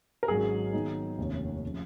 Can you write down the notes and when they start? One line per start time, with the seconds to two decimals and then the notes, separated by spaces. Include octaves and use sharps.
0.23 A#4
0.28 G#1 G#2 F#3 C#4 F#4 G#4
0.73 D#3 F#3 B3 D#4
1.18 F1 D#2 D#3 A#3 C#4
1.65 C#3 F3